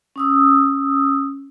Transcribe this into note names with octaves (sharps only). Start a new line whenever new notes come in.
C#4 D#6 E6